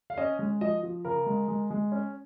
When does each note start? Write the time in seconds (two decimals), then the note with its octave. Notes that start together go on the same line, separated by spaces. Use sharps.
0.10 F5
0.17 C#4 D#5
0.39 G#3
0.61 F3 D#5
0.83 F3
1.05 C#3 A#4
1.26 G#3
1.48 G#3
1.70 G#3
1.92 C#4